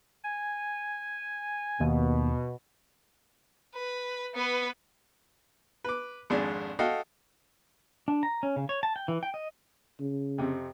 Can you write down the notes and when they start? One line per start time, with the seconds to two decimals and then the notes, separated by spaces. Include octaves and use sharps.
0.24 G#5
1.80 D#2 B2
3.75 B4
4.35 B3 B4
5.84 B4 D6
6.30 G#1 F2 G#3 D4 D5 G#5
6.79 F#4 A4 D#5 F5 G5
8.08 D4
8.23 A#5
8.43 C#4
8.56 C#3
8.69 C#5
8.83 A5
8.96 G5
9.08 E3
9.23 G5
9.34 D#5
10.00 C#3
10.38 F2 C3